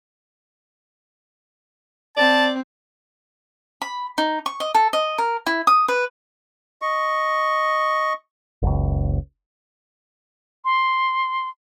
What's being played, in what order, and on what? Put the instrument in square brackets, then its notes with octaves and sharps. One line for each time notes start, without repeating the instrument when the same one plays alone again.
[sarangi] C4 [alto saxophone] D5 [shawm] A5
[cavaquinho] B5
D#4
C#6
D#5
A4
D#5
A#4
E4
D#6
B4
[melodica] D#5 C#6
[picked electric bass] F#1 C#2
[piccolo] C6